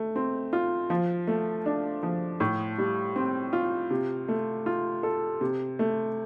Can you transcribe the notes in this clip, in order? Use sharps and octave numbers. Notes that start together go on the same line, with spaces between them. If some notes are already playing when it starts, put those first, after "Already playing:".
Already playing: A3
C4
F4
F3
A3
D4
F3
A2
G3
C4
F4
C3
A3
F4
A4
C3
A3